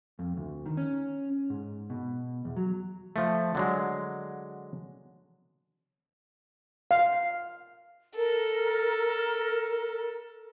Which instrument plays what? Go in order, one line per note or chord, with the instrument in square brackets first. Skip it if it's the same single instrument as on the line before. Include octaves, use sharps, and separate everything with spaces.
[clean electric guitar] F2
D2
D#3
C#4
G#2
B2
E2
F#3
[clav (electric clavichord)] F3 A3
D3 F#3 G#3
[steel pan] F5
[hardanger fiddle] A4 [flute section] A#4